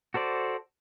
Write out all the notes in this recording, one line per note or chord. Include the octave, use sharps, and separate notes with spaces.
F#4 A4 C5 D5